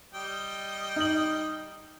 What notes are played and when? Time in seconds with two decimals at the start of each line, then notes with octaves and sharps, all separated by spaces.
0.14 G3 D#5 G5
0.96 D#4 F#7